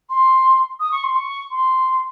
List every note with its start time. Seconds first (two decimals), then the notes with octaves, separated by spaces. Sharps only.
0.10 C6
0.80 D#6
0.91 C#6
1.03 C6
1.15 C#6
1.51 C6